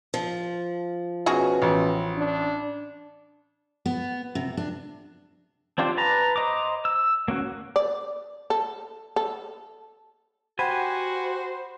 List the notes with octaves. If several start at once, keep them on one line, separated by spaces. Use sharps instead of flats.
F3
B2 C#4 F#4 G#4
A1
D4
B3
C3
D4
C4 D4 F4 G4 C5
B4 A5 A#5
C5 D#5 A#5 D6
E6
A#3 C#4 F#4
D5
A4
A4
F#4 G4 C5 F#5 G#5 B5